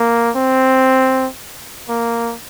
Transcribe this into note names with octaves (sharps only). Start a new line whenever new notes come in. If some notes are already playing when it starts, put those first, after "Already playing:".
Already playing: A#3
C4
A#3